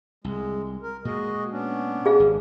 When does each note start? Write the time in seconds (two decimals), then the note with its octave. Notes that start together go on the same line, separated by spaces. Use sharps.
0.24 C2 G#3
0.83 A#4
1.05 A#2 G#3 F#4 G#4 D#5
1.50 B3 C#4 D4
2.06 G#4 F5
2.20 G#1